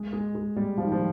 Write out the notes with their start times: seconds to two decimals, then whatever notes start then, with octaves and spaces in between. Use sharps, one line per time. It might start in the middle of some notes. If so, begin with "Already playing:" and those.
Already playing: G#3
0.13 G#3
0.35 G#3
0.56 G3
0.78 F3
0.84 D#3
0.92 F3